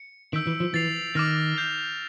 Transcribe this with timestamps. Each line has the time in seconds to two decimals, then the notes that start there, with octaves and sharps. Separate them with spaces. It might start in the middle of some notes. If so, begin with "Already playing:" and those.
Already playing: C#7
0.33 D#3 E6 G6 B6 D7 F#7
0.47 E3
0.60 F3
0.74 E3 A6 C7 F7
1.15 D#3 D6 F6 A#6
1.57 G6 C7 F7